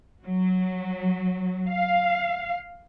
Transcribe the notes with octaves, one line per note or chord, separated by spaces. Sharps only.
F#3
F5